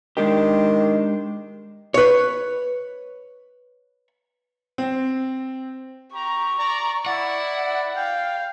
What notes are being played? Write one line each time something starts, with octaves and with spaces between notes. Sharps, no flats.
D#3 G#3 D4 G4
B4 C#5
C4
G4 A#5 C#6
D5 A#5
E4 D5 F#5
F5 G5